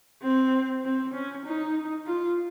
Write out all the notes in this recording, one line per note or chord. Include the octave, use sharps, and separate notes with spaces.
C4
C4
C#4
D#4
F4